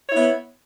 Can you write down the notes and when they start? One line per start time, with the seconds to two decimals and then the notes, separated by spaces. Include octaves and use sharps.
0.07 C#5
0.11 E4
0.15 B3